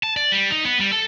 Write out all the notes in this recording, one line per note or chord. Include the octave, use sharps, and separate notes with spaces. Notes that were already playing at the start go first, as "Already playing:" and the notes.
A5
D5
G3
D#4
B3
G3
A4